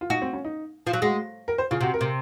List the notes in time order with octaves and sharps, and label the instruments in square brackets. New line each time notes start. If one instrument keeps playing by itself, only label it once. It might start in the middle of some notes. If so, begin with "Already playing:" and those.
[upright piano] F4
[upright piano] D#4 [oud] F#4
[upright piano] C4
C#4
D#4
[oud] F3
F#3
[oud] G#3 [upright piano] F#4
[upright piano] A#4
C5
[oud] C#3 [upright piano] F4
[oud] C3 [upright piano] F#4
[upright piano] A#4
[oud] C3